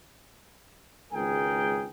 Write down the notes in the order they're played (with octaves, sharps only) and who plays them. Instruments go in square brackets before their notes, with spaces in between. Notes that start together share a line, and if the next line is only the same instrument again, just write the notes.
[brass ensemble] G#1 C#2 G#4 A#4 G5